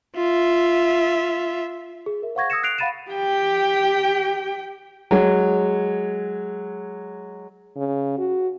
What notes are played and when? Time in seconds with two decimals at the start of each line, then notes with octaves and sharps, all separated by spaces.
0.16 F4 E5
2.06 G#4
2.22 A#4 E5
2.35 C5 F5 F#5 C#6 G#6 A#6
2.50 D#6 E6 G#6 A#6 C#7 E7
2.63 D#6 F#6 C7 D7 F7
2.78 F5 F#5 B5 A6 D#7 E7
3.11 G4 G5
5.11 F#3 G#3
7.76 C#3
8.18 F#4